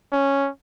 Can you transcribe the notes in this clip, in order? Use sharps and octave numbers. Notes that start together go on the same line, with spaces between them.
C#4